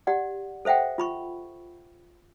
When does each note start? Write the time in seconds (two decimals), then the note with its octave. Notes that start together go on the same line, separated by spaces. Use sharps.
0.07 G4 D5 F#5
0.65 A4 C5 E5 F#5 G5
0.98 F4 B5 C#6